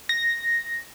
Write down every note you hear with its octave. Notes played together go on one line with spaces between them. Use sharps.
A#6